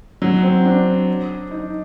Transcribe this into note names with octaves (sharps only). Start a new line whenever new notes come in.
F#3
C4
D4
D#4